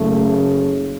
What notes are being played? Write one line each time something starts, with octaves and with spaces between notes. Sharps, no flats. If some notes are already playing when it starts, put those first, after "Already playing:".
Already playing: F#1 F#2 C#3 A3